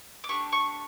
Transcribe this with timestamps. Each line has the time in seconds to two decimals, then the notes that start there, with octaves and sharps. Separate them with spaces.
0.24 D6
0.29 A3 D4 G4 C#6
0.52 C#6